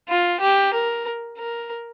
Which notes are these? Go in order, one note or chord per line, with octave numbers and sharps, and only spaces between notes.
F4
G4
A#4
A#4